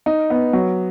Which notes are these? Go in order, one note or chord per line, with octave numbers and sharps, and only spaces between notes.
D#4
B3
F#3